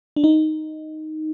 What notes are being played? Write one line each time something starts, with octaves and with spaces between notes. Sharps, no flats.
D4
D#4